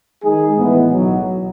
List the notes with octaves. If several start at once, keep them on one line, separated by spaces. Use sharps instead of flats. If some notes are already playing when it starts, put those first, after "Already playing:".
D#3 G#3 D#4 G#4
A2 E3 G#3 B3
B1 B2 F#3